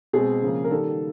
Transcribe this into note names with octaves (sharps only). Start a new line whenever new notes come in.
B2 G#3 C4 G#4
C#3 F3 A#3
A#4
D#3 G3 A#3 A4